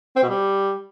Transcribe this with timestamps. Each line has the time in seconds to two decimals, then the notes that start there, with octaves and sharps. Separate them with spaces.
0.16 C4
0.23 B2
0.29 G3